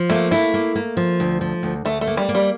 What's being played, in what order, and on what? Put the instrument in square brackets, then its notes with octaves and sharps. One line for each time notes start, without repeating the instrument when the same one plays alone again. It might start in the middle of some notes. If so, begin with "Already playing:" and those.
Already playing: [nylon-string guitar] F3
[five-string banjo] A3 [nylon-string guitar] A#3
[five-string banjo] A3 [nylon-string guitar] E4
[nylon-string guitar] A#3
A#3
F3
D2
F3
D2
[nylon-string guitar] D2 [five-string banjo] A3
[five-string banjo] A3
[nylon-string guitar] A#3
[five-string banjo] G3
[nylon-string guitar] A#3
[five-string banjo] G3